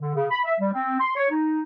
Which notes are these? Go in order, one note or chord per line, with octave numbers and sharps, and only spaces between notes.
D3
C#3
B5
E5
G3
C4
C6
C#5
D#4